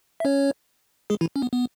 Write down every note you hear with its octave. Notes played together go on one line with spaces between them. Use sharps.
E5
C#4 C#5
G#3 G#4
E3 E4
C#4
B3
B3